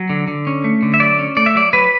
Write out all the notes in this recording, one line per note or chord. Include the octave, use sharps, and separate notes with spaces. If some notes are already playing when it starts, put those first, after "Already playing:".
Already playing: F#3
D3
D3
C#4
A3
D3
E5
F#3 D5
C#4
A3 D5
E5
F#3 D5
F#3 B4